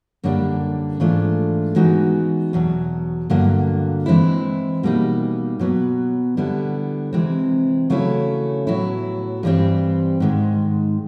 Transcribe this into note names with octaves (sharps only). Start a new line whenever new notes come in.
F#2 D3 G3 A#3 D4
G#2 E3 A3 D4 F4
E3 G#3 B3 D#4 F#4
E2 B2 F#3
G2 D3 F#3 A#3
E3 G#3 C4 E4
B2 G3 A#3 D#4
B2 F#3 B3
D3 G3 B3 E4
C3 E3 G#3 C4
C#3 F#3 A3 C#4 E4
A2 F#3 B3 E4
G2 E3 G3 C4
G#2 D#3 G#3